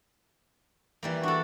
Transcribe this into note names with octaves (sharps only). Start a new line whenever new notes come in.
E3 G3 A#3
D4 F#4 A4